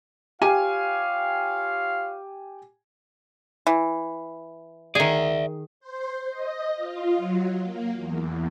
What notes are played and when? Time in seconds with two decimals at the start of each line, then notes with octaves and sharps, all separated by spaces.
0.42 F4 G4 C#5 F5 G#5 D#7
3.67 E3
4.95 D#3 G#4 D5 E5
5.80 C5
6.30 D#5
6.75 F4
7.17 F#3
7.63 A#3
7.95 E2